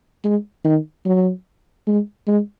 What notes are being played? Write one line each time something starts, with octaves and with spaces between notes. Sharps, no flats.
G#3
D#3
F#3
G#3
G#3